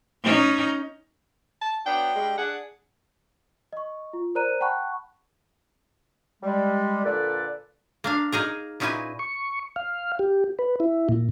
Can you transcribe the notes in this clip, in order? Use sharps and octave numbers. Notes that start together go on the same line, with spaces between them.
C#4 D#4
A5
F#3 B3 D4 G5
G2 G3 G#3
D4 G#4 F#5
D#5 C#6
F4
A#4 C5 D5 A#5 F#6 D#7
F#5 G5 A5 B5 C#6 F#6
G3 G#3
A#2 D3 A4 B4 D5
A#3 D4 F5
A#3 D#4 G#4 A#4
A#2 C#4 D#4 E4 B4 G#5
C#6
F5
G4
B4
E4
A#2